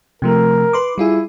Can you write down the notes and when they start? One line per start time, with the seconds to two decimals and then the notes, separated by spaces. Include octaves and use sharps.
0.22 C3 F3 A3 A#4
0.73 B4 C6 D6
0.98 G3 E4 F4 G#4